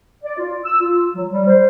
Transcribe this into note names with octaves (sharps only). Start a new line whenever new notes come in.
D5
F4
E6
F4
F#3
G3
C5